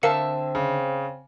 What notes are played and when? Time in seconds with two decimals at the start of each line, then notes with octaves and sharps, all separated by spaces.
0.03 D3 C4 A#4 E5 F5 A5 C#7
0.55 C#3